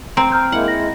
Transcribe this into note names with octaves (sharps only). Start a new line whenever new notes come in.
C4 A#5 D7
A#5 F6 G6
G#3 A#3 E4 F#5
G#3 E4 A#6